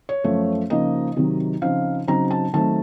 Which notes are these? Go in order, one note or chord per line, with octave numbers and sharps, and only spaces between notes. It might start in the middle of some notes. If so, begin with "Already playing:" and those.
C#5
F#2 F3 A3
C#3 F3 A#3 D#4 D#5
C3 D#3 F#3
C#3 F3 C4 D#4 F5
C#3 F#3 C4 D#4 A#5
A5
D#3 F#3 A3 C4 A5